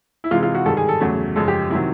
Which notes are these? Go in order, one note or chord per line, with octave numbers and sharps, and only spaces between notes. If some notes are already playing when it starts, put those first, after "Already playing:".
E4
C3 E3 G#3 F4
F4
F#4
G#2 D#3 G3 A4
G#4
A4
E2 C#3 F#3 A3
F#2 C#3 F3 G#3 A4
G4
C3 D#3 F#3 E4